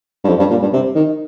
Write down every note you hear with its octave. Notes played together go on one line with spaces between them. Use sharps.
G2
F2
G2
A#2
G2
C3
D#3